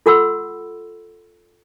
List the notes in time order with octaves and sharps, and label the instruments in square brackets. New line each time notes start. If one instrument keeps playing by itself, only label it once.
[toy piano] F4 A4 F#5 B5 C6 E6